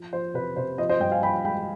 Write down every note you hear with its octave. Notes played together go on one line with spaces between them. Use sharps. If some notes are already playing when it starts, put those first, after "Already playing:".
Already playing: F3
F3 C5
C3 B4
C3 C5
F3 C5 D#5
C5 D#5
G2 D#5 G5
F5 G#5
F3 G5 B5
G#3 G5 B5